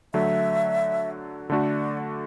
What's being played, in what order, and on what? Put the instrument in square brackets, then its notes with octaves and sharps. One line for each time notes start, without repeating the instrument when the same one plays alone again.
[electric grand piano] D3 F#3 A3 [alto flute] E5
[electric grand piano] D3 A3 D4 F#4 [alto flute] D5